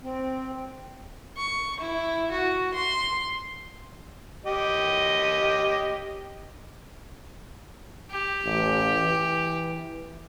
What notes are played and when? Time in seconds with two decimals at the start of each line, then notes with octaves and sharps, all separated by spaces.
0.02 C4
1.37 C#6
1.80 E4
2.31 F#4
2.74 C6
4.46 G4 D#5
8.11 G4
8.45 A1
8.95 E3